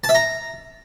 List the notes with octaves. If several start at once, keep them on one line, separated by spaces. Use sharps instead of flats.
A5
E5
A#5